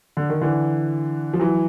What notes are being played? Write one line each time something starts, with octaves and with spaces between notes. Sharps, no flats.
D3
D#3
D3 E3
F3
E3 F#3